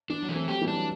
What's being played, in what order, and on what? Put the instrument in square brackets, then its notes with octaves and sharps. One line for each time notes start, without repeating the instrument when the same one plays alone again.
[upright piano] E3 [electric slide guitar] D4
[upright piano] F#3
[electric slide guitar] E3
[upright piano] A3 C4
[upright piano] F#3 [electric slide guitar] G4
[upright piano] E3 G3
[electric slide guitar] D4
[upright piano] F#3